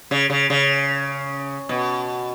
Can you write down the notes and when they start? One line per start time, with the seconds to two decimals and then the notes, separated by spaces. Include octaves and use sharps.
0.11 C#3
0.30 C#3
0.50 C#3
1.69 B2